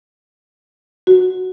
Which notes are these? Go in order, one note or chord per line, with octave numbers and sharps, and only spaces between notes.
F#4